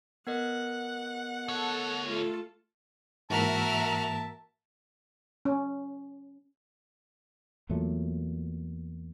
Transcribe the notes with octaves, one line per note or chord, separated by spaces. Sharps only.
B3 A#4 D#5 F#5
D2 A4 C#5
A3 F4 A4
G#2 E3 A#3 F#4 A#4 E5 A5 F6
C#4
E2 A#2 F#3 A3